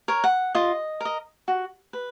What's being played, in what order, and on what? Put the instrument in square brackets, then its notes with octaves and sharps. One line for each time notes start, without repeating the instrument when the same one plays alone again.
[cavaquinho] A#4 C#5
F#5
F4 D#5
A#4 D#5
F#4
B4